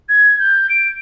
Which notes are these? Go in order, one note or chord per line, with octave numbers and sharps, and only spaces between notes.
G#6
G6
D7